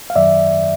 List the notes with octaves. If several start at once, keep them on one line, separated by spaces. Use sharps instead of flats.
F5
F#2 D#3 F#3 D5 E5